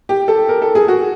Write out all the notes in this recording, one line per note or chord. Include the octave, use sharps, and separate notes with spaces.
G4
A4
A#4
A4
G#4
F#4